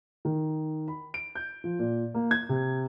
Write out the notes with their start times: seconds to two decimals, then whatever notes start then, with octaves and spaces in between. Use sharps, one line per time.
0.25 D#3
0.88 B5
1.14 D7
1.35 G6
1.64 F3
1.79 A#2
2.14 A#3
2.31 G#6
2.49 C3